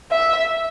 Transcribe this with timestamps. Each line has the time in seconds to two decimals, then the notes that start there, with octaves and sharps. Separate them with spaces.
0.11 E5